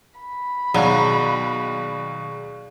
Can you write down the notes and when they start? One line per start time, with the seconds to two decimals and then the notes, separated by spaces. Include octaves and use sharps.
0.20 B5
0.74 D#2 B2 F#3 G#4 D5 F5